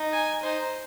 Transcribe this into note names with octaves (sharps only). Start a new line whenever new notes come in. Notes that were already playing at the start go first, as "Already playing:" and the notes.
Already playing: D#4
G#5
D#4 C5